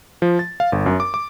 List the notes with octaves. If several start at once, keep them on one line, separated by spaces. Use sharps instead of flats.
F3
A6
F5
G1
F#2
D6
D6